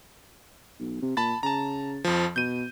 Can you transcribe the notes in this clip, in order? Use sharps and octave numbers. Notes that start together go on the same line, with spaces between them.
B1
C3
A#2 A5 B5 A6
C#3 A5 A#5
F2 F3
B2 G6 D#7